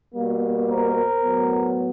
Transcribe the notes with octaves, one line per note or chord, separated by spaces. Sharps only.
B2 G3 A#3
A#4 C5
A2 F#3 B3